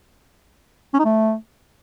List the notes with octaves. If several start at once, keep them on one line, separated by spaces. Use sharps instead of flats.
C#4
D#4
A3